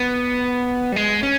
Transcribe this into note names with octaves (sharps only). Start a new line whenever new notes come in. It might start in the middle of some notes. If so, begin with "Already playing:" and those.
Already playing: B3
G3
G#3
C#4